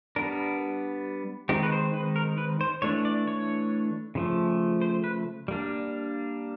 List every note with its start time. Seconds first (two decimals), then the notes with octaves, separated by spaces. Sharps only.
0.16 G3 B3 D4 A#4
1.49 D#3 G#3 C4 D#4 G4
1.63 B4
1.72 C5
1.94 B4
2.16 A#4
2.38 B4
2.61 C5
2.82 E3 A3 D4 C#5
3.05 D5
3.27 C#5
4.15 C#3 F3 A3
4.82 C5
5.04 B4
5.48 G3 A#3 D4